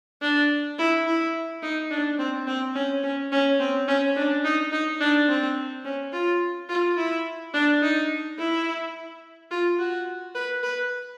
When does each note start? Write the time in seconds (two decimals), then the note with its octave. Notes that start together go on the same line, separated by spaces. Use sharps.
0.22 D4
0.78 E4
1.06 E4
1.63 D#4
1.90 D4
2.19 C4
2.47 C4
2.75 C#4
3.03 C#4
3.32 C#4
3.60 C4
3.88 C#4
4.16 D4
4.44 D#4
4.72 D#4
5.00 D4
5.29 C4
5.85 C#4
6.13 F4
6.69 F4
6.97 E4
7.54 D4
7.82 D#4
8.38 E4
9.51 F4
9.79 F#4
10.35 B4
10.63 B4